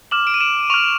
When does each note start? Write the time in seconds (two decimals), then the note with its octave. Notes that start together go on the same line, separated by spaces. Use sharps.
0.11 D6 F6 E7 F#7
0.27 D7 E7
0.34 D#7
0.41 D7 E7
0.70 C#6 F6 D#7 F7